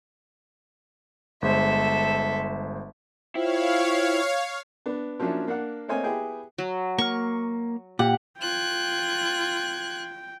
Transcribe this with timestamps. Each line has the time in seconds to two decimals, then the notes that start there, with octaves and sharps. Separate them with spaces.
1.42 G1 G#3 A4 C5 E5
3.35 E4 F4 C5 C#5 F5 G5
4.86 B3 D4
5.20 F3 F#3 A#3 C#4 D4 E4
5.47 A#3 D4 A#4 F#5
5.88 A3 A#3 C4 C#5 D#5 G#5
6.03 B3 E4 G4 G#4 G5 G#5
6.58 F#3
6.98 A#3 C#6 F6
7.99 A#2 G4 F#5
8.39 F4 G5 F#6 G#6